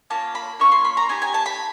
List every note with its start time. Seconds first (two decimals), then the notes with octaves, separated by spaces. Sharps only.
0.10 A#3 C#4 F4 A5
0.35 B5
0.59 A#3 C#4 F4 C#6
0.72 C6
0.85 B5
0.97 A#5
1.09 B3 D#4 G4 G#5
1.22 G#5
1.34 A5
1.46 B5